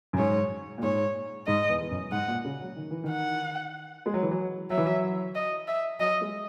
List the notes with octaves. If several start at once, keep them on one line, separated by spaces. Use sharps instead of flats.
F#2
G#2 C#5
A#2
G#2 C#5
G#2 D#5
E2
E2
F#2
G#2 F#5
A#2
C#3
F#3
D#3
E3
D#3
F#5
G#3
F#3
E3
F#3
F#3 E5
E3
F#3
D#5
E5
F#3 D#5
G#3